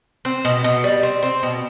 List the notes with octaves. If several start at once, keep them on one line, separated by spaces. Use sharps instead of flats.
C4
B2
B2
G3
C4
C4
B2